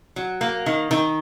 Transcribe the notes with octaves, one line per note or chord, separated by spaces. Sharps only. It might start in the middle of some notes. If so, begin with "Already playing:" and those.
F#3
A#3
D#3
D#3